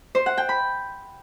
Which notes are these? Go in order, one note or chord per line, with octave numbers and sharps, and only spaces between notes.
C5
F#5
G5
B5